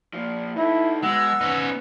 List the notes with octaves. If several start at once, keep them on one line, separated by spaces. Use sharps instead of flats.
A#2 F3
D#4 E4 A4
B2 G#3 F#5 E6
B3 C#4 D#4